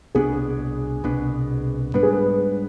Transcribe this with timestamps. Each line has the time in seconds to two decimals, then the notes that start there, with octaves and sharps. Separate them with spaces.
0.15 C2 B2 B3 D4 G#4
1.04 C2 B2 B3 D4
1.94 G#2 G3 B3 D4 B4
2.03 G#4
2.13 B4